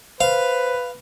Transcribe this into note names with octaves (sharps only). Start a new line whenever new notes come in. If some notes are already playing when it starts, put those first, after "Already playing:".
B4 C5 F5